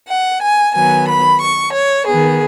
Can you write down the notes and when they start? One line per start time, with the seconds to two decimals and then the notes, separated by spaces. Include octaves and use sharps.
0.09 F#5
0.43 G#5
0.75 D#3 F#3 B3 G#5
1.08 B5
1.41 C#6
1.74 C#5
2.07 D#3 B3 G#4